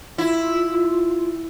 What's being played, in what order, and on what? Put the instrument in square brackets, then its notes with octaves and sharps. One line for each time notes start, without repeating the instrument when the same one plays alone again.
[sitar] E4 [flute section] F4